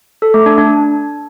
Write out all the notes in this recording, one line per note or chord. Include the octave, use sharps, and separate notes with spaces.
A4
A3
D4
D4